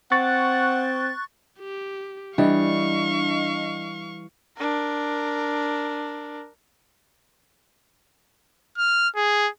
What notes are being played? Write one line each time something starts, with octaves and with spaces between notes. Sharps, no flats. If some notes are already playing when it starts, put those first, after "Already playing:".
C4 F#5 C#6 F#6 A6
G4
E3 G3 D4 D#5 F5 C#6
D4 A#4
F6
G#4